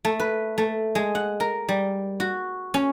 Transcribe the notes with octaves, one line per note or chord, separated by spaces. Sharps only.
A3
B4
A3
G#3
F#5
A#4
G3
F#4
C#4